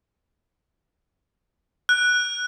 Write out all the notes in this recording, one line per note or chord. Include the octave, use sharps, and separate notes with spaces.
F#6